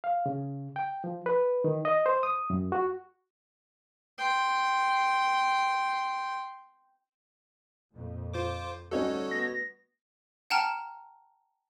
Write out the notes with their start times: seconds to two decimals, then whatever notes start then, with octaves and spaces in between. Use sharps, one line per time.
0.04 F5
0.26 C#3
0.76 G5
1.04 F3
1.26 B4
1.64 D#3
1.85 D#5
2.06 C5
2.23 D#6
2.50 F#2
2.72 F#4
4.18 G5 C6
7.93 F2 A#2
8.34 F4 C5 D6
8.91 D2 G3 C#4 D#4 F#4 A4 C#5
9.31 B3 A#6
10.50 F#5 G5 A5 A#5 F6